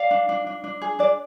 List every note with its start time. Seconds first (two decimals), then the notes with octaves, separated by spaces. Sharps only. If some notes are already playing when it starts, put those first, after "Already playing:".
Already playing: D5 F5
0.11 D4
0.29 D4
0.47 D4
0.64 D4
0.82 G#4
0.99 D4 D5